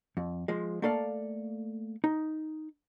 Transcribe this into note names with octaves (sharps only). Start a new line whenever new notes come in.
F2
F3 G#3
A3 A#3 A4 D5 F5
D#4